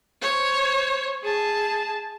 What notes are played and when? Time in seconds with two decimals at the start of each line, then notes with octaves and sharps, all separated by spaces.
0.22 C5 C#5
1.23 G#4 A5